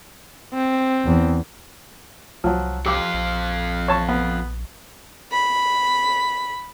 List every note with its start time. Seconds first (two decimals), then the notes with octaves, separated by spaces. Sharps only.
0.54 C4
1.05 E2
2.44 C2 F3 F#3
2.86 F2 F4 G4 D6
3.14 A#1
3.88 C#5 A5 C#6
4.09 B3
5.31 B5